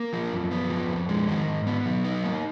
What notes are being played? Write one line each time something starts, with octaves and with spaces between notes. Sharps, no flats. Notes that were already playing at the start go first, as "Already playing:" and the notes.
Already playing: A#3
F3
F#2
B3
F3
F2
G#3
D#3
G#2
B3
F#3
D#4
A#3